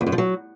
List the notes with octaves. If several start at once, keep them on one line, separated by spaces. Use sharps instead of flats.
E2
F#2
F3
F#3